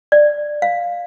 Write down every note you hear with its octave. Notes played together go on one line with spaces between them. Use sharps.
D5
F5